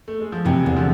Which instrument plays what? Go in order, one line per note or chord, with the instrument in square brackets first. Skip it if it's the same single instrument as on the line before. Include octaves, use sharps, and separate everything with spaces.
[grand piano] A3
G#3
F3
[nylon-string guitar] C3 [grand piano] E3
[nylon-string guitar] E2 [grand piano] G#3
[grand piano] D3 F3